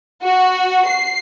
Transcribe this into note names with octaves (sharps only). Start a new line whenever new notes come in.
F#4
C7